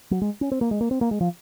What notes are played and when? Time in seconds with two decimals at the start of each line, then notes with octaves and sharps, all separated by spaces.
0.11 F#3
0.22 G#3
0.41 C#4
0.52 C4
0.61 A#3
0.71 G#3
0.81 A#3
0.91 C4
1.01 A#3
1.11 G#3
1.21 F3